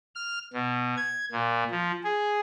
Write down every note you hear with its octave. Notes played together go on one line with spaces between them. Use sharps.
F6
B2
G#6
A#2
F3
G#4